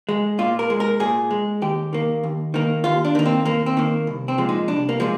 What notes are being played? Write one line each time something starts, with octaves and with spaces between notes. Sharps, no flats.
G#3
A#2 F4
A#4
G#3
A#4
A#2 G#4
G#3
D#2 G4
D#3 A#3
D#2
D#3 A#3
D#2 F4
D4
D#3 A#3
C4
D#2 A#3
C4
D#3 A#3
C2
C4
A#2 F3 G#3
D#4
C2 D4
A#3
A#2 F3 G#3